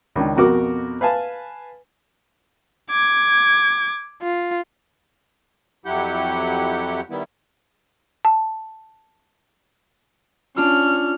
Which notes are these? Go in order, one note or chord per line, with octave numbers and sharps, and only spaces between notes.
C#2 D#3 D4
F2 B2 F#4 A#4 D6
B4 F5 G#5 A5
D6 G#6
F4
F2 F#3 E4 G4 F#5 G6
D#3 G3 B3 E4
A5
C#4 D4 F4 F6